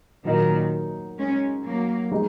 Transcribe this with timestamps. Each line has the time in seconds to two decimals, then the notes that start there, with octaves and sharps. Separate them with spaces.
0.25 A#2 D#3 F#3 D#4 A#4
1.18 G#3 C#4
1.65 F#3 A#3
2.12 G#3 D#4